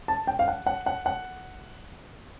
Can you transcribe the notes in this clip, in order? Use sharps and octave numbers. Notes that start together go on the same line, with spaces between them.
A5
G5
F5
F#5
F#5
F#5
F#5